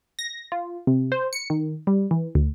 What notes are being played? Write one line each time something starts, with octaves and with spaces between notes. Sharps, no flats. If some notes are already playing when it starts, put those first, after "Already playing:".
A#6
F4
C3
C5
C#7
D#3
G3
E3
D2